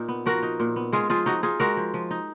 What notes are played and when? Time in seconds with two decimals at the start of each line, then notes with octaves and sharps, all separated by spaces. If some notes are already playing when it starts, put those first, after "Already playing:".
Already playing: A#2 D#4
0.09 B3
0.26 F3 F#4 A#4
0.43 D#4
0.60 A#2
0.76 B3
0.93 G#3 F4 G#4
1.10 F3 F4 G#4
1.26 F3 D#4 F#4
1.43 D#4 F4 G#4
1.60 G#3 F#4 A#4
1.77 F3
1.94 F3
2.11 D#4